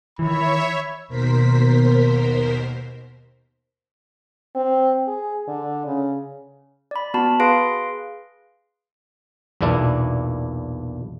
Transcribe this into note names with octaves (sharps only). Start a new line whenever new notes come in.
D#3 E3 C#5 E5 B5
D#2 B2 A#4 C5 B6
C4
G#4
D3
C#3
D5 B5
B3 F#4 A5 B5
G#4 B4 F5 C6 A#6 D7
B1 E2 A#2 D4 E4